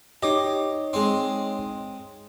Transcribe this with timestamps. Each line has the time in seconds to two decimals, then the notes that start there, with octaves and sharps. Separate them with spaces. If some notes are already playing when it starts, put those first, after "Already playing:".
0.23 D#4 G4 C#5 D#5
0.93 G#3 C4